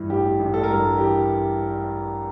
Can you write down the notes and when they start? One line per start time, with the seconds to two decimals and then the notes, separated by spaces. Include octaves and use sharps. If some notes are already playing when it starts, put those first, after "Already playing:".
Already playing: G2 E3
0.10 A1 G4
0.39 A1
0.54 A4
0.63 A#4
0.69 G2 A4
0.97 E3 G4